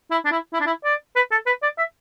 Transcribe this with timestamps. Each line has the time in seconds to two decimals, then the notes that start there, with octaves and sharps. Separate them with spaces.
0.11 E4
0.25 D4
0.31 E4
0.53 E4
0.60 D4
0.67 E4
0.84 D5
1.16 B4
1.31 A4
1.46 B4
1.63 D5
1.78 E5